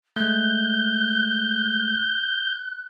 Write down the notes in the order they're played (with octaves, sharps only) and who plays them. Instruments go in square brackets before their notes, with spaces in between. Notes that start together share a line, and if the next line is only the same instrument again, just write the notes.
[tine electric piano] G#3 A3 [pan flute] F#6 [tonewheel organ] G6